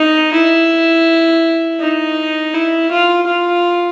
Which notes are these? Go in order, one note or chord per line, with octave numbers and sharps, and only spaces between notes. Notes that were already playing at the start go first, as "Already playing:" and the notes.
Already playing: D#4
E4
D#4
E4
F4
F4